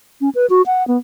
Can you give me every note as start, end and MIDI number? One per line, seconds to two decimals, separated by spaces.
0.21 0.30 61
0.35 0.46 71
0.50 0.62 66
0.66 0.86 78
0.88 0.97 59